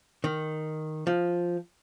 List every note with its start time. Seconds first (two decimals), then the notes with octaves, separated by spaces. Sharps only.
0.24 D#3
1.07 F3